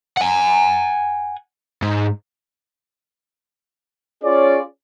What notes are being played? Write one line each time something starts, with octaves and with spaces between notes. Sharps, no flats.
F#5 G#5
G#2
C#4 F4 G#4 C#5 D5